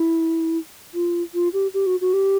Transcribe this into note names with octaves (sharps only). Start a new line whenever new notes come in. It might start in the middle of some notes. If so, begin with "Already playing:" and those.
Already playing: E4
F4
F4
G4
G4
F#4
F#4
G4